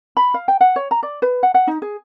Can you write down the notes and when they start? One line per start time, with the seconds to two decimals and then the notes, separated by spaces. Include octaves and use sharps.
0.17 B5
0.34 F5
0.48 G5
0.61 F#5
0.76 C#5
0.91 A#5
1.03 D5
1.22 B4
1.43 F#5
1.54 F#5
1.67 D#4
1.82 G#4